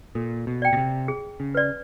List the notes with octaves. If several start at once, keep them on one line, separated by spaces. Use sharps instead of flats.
A#2 A4
B2
D5 G5
B2
C3
G#4
C#3
B4 D5